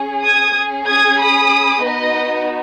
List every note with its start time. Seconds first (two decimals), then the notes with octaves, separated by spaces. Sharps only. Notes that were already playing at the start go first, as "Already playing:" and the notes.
Already playing: C#4 G#4
0.24 D#6 G#6
0.56 C#4 G#4
0.88 D#6 G#6
1.20 B5 D#6
1.83 B3 D#4 F#4 B4 D#5